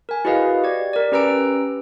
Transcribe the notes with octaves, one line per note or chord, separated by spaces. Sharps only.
A#4 G#5
E4 F#4 G#4 B4 D#5 F5
G4 D5 G#6
A#4 D5
C#4 G4 B4 A#5 E6 D7